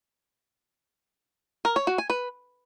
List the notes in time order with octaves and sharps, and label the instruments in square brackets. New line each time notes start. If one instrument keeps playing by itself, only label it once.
[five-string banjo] A#4
C#5
F#4
G#5
B4